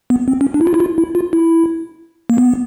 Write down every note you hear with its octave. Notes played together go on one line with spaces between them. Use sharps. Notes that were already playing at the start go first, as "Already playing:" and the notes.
B3
C4
C#4
D4
E4
F4
E4
F4
E4
F4
E4
A#3
B3